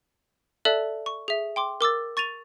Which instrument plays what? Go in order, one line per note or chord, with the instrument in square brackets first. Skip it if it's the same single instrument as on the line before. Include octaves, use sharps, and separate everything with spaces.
[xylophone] A4 D5 E5 A5 F#6
C#6
G#4 E5
G5 C6 D6
A#4 D6 E6 A6
C#6 A6 D#7 F7